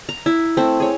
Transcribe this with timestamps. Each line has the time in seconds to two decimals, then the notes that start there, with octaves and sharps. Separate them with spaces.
0.09 A#5
0.26 E4
0.57 A3 C4
0.80 G#4 C#5